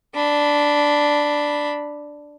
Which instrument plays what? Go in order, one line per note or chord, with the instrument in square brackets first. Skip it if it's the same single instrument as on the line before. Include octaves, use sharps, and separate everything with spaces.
[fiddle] D4 B5